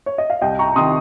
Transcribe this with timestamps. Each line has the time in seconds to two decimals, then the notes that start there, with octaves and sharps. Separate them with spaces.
0.06 C#5
0.18 D#5
0.30 F5
0.42 C2 D#5 G5
0.59 A#5 C#6
0.76 C3 D#3 C6 D#6